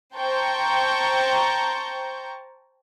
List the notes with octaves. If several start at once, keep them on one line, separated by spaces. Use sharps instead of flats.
C5 G5 A5 A#5 C#6 G6